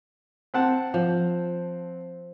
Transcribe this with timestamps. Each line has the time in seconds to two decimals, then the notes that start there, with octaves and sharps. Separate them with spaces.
0.54 C4 F#5 A5
0.94 F3